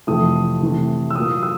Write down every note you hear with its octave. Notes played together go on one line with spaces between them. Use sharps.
F2 C3 E3 A3 D#6
C3 E3 A3
E6
A#2 F#3 A#3 D#6
E6